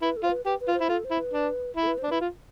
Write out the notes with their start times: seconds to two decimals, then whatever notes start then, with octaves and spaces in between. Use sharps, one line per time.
0.02 E4 B4
0.17 A4
0.23 F4 C5
0.31 B4
0.46 G4 B4
0.60 B4
0.68 F4
0.74 C5
0.81 E4
0.89 F4 A4
1.05 C5
1.11 E4
1.19 B4
1.34 D4
1.77 E4
1.82 A4
1.87 B4
1.98 C5
2.03 D4
2.09 E4 B4
2.21 F4